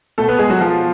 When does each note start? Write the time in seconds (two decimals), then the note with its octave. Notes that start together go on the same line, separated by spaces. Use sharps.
0.18 B2 A3 A4
0.28 B3 B4
0.39 G#3 G#4
0.49 F#3 F#4
0.61 F3 F4